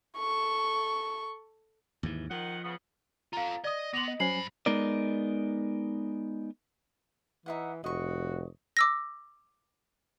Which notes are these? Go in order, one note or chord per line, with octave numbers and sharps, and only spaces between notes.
A4 C#6
D#2 G#2 E3
D#3 F3 F#5
C#3 B3
F4 A4 F5 A#5
D5 D#5 D#6
B3 C6 D6 A#6 F7 F#7
D#5
G2 F#3 C#4 C5 G#5 B5 C7 F#7
G#3 B3 D#4 A#4 D5
E3 D#4 E5 F#5
F1 F#4 D#5 C#6
D6 E6 A#6